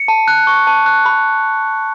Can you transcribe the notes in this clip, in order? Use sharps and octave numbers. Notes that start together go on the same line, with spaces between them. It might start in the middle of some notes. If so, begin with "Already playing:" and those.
Already playing: C#7
A5
F#6
C#6
A5
F#6
B5